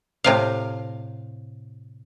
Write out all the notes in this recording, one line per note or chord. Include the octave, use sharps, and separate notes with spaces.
A2 C3 F5